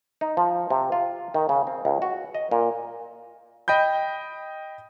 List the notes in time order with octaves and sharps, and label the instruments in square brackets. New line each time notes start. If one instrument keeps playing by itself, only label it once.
[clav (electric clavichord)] D#4
F3
C3
F4
D#3
C#3
C4
C#2
F#4
D#5
A#2
[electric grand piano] D#5 G5 B5 G6